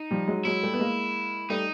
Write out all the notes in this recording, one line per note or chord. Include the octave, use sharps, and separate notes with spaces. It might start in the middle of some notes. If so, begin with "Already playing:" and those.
Already playing: D#4
F3 G3
F#3 G#3
F#3 G#3 E4
G3 A3
B3
G#3 A#3
G3 A3 D#4